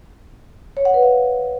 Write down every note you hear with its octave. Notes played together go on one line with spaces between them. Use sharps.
C#5
F#5
B4
F5